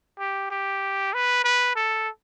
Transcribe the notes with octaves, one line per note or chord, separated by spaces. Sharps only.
G4
G4
B4
B4
A4